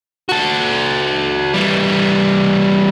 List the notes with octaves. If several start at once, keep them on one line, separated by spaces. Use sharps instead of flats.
F#4 A4
E3 G3